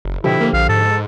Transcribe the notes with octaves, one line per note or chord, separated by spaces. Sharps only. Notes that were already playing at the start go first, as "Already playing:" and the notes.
F#1
B2 D3 F3 E4 G4
A#3
A#1 F5
G#2 A4